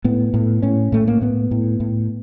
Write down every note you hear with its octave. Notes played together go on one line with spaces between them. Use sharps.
A2 B3
A2
A2 C#4
A2 A3
A#3
A2 B3
A2
A2